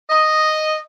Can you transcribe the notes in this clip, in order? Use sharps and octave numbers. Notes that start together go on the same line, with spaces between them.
D#5